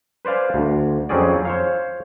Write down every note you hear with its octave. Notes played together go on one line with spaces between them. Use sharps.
B4 C5 D5 F5 G#5
D2
F2 F#3 C4 C#4 G#4 D5
C5 C#5 F5